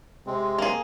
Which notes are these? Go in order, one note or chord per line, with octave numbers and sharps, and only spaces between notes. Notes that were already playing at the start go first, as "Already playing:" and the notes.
C3 G#3 C4
A#3 G#4